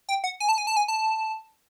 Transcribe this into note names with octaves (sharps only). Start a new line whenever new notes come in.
G5
F#5
G#5
A5
G#5
A5
G#5
A5